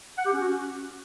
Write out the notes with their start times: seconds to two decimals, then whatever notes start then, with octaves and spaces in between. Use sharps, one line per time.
0.18 F#5
0.25 G4
0.33 C#4
0.41 F#4
0.48 C#4